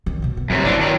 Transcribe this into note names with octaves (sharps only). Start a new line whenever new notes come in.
F#2 D#3
B2 A#3
B3
F#2 C3
F#1 E3 D4
D#3 F#3